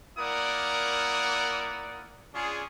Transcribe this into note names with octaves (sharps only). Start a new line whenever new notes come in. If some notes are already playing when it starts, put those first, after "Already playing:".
A#3 E4 A#4 D5 F#5 D#6
C#4 D4 F4 G#4